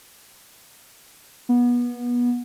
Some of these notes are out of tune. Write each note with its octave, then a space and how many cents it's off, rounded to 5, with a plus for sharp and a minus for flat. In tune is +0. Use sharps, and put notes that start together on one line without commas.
B3 -25